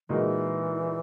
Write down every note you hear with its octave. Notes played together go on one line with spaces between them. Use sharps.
A#2 E3 G#3 D#4 F#4 A#4